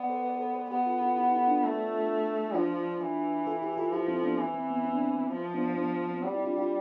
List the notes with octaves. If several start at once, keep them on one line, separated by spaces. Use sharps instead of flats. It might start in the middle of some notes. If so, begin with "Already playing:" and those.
Already playing: B3 B4 D5
A4 C5
B4 D5
B4
A4 C5
A4 C5
B3 G4 B4
F4 A4
F4 A4
E4 G4
E4 G4
D4 F4
A3
F3 D4 F4
E3
F4 A4
E4 G4
G4
F4 A4
F3 E4 G4
C4 E4
B3 D4
E3 C4
C4
B3
C4
D4
C4
C4
F3
B3 D4
B3 D4
C4
B3
G3 C4
C4 E4
D4 F4
D4 F4